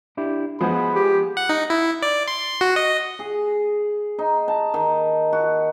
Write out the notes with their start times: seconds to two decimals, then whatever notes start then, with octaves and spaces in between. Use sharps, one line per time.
0.17 D4 E4 G4
0.61 F3 G#3 B3 G#4 C5 F#5 B5
0.95 G4
1.37 F#5
1.49 D#4
1.70 E4
2.02 D5
2.28 C6
2.61 F#4
2.76 D#5
3.19 G#4
4.19 D#4
4.48 A5
4.74 D#3
5.33 F#4